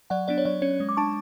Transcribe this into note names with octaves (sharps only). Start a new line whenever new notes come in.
F#3 D5 F#5
B3 D4 D5
C#5
F#3 D5
C#4 C#5
G#3
D6
D4 A5 C#6